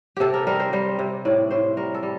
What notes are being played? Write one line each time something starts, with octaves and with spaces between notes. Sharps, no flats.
C3 G4 A4
A#4
G3 A#4
C5
G3 C5
C3
A2 D5
A2 C5
G3 A#4
A4
G3